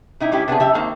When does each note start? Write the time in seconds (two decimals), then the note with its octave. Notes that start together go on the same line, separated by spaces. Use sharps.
0.20 C3 D#4 E4
0.32 G#3 C#4 E4 G4
0.48 C3 B3 D4 G#4
0.60 F#2 G4 E5
0.74 D#3 A#3 C4